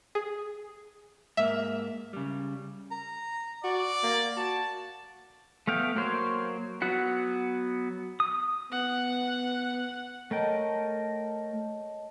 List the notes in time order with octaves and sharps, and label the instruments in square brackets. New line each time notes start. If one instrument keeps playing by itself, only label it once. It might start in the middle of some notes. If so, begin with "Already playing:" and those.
[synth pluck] G#4
[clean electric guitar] G#2 A#3 [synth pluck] E5
[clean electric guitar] C#3 G3
[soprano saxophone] A#5
[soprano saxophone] F#4 [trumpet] D5
[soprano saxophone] A#3
[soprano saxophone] F#4 [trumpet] A5
[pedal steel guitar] A3 B3 F5 G5
F#3 A#3 C5 C#5
F#3 B3 F#4 F#5
D#6
[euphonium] B3 [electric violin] F#5
[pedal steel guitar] A3 A#4 G5 [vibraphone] C#5 D#5 A5